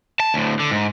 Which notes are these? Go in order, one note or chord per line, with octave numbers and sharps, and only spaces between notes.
A5
D2 A2
D3
G#2